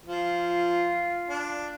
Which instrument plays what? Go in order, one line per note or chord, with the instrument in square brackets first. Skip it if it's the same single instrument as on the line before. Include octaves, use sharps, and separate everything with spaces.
[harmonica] F3 [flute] F4
[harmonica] D4